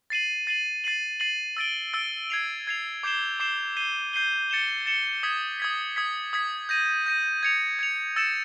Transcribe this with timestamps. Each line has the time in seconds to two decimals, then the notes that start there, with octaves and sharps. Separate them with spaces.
0.10 A6 C7 D#7 F#7
0.47 A6 C7 D#7 F#7
0.84 A6 C7 D#7 F#7
1.20 A6 C7 D#7 F#7
1.57 E6 A6 D7 G7
1.93 E6 A6 D7 G7
2.30 G#6 C7 F7
2.67 G#6 C7 F7
3.03 D6 G6 C7 E7 G7
3.40 D6 G6 C7 E7 G7
3.77 G6 C7 D#7 G7
4.13 G6 C7 D#7 G7
4.50 A6 C#7 E7 G7
4.86 A6 C#7 E7 G7
5.23 D#6 G#6 B6
5.60 D#6 G#6 B6
5.96 D#6 G#6 B6
6.33 D#6 G#6 B6
6.69 G6 A#6 D#7
7.06 G6 A#6 D#7
7.43 G#6 C#7 F7
7.79 G#6 C#7 F7
8.16 E6 A6 C#7 E7